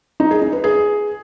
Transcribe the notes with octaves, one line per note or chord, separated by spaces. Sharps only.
D#4
G#4
D#4
B4
G#4